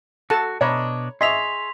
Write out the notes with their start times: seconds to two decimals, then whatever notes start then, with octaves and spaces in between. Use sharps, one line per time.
0.30 F#4 A4 A5
0.61 B2 D4 C#5 D#5 A#5 B5
1.21 G#4 D#5 E5 C6 C#6 B6 F7